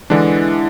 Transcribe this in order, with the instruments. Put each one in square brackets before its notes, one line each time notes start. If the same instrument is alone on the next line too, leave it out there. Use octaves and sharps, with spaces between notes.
[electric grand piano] D3 G#3 D4 [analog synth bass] E3